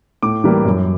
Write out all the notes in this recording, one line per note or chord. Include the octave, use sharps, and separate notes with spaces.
A2 D6
E3 G3 A#3
F#2